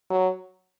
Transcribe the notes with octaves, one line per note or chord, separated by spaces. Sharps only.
F#3